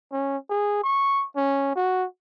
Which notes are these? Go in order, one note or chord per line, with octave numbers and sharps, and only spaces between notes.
C#4
G#4
C#6
C#4
F#4